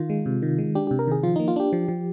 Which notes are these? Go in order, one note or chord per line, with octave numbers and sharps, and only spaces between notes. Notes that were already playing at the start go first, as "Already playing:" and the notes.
Already playing: D#3 F4
G#3
C3
D#3
G#3
D4 G4
C3 G4
A#4
D#3 G#4
F3 F4
A#3 D#4
F4
D4 G4
F3
F3